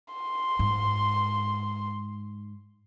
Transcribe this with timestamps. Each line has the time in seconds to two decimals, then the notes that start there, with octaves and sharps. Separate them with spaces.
0.15 C6
0.59 G#2